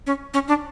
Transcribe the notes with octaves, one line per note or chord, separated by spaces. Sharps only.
C#4
C#4
D4